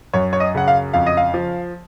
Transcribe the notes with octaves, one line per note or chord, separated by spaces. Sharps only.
F#2 C#5
C#5
D#5
C#3 F#5
F5
F2 F5
D#5
F5
F3